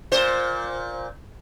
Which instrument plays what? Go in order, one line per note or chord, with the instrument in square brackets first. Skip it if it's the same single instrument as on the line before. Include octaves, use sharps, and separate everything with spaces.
[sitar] A#2 C5